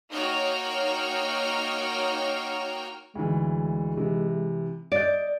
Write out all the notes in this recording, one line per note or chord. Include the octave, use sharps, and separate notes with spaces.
A#3 D#4 F#4 C#5 G5 F6
D2 E3 G#3
C3 E3
D5 D#5 G6